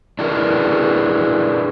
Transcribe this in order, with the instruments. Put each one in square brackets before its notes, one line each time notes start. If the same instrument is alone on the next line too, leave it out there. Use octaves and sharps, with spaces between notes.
[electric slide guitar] D4 E4 G#4 A#4 B4